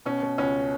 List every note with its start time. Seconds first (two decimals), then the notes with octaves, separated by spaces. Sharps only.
0.05 B2 C#4
0.22 B2
0.38 C#2 C#4